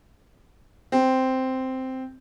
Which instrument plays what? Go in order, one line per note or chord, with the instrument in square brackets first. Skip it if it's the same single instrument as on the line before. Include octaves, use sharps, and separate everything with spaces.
[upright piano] C4